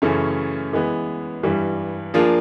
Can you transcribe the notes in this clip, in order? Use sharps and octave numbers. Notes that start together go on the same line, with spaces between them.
F#2 C#3 E3 A3 C#4
E3 G#3 B3
G2 E3 G3
F3 A#3 D4 F4 G#4